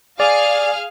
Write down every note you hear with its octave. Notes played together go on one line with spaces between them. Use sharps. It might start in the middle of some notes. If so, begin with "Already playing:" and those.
G#4 D5 F5 F6